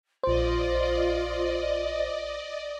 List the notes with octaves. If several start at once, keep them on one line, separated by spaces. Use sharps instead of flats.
A#1 F4 C5 D5 D#5